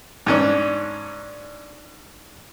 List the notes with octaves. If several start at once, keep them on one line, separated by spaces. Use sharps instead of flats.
G#2 C#4 D4